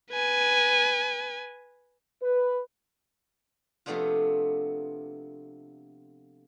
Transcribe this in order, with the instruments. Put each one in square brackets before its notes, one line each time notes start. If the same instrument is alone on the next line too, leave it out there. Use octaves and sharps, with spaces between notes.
[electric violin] B4 G#5
[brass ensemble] B4
[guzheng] C3 F3 A3 B3 D4 F4